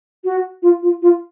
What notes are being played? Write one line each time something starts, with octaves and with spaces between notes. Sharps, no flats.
F#4
F4
F4
F4